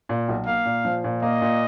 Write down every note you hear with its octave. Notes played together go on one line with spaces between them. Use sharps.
A#2
B1
A#3 F5
A#2
F3
A#2
A#3 D#5
A#2